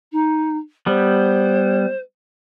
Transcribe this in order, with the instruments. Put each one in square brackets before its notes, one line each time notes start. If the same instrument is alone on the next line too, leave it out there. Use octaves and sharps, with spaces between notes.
[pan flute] D#4
[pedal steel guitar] G3 B3 [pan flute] C5